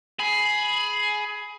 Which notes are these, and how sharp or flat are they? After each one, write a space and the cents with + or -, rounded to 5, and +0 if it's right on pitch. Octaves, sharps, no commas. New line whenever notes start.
G#4 +15 B5 +0